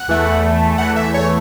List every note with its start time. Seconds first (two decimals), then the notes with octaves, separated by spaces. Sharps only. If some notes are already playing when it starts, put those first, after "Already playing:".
Already playing: F#5
0.08 E2 E3 A3
0.78 E2 E3 A3 F#5
0.96 E5
1.14 C#5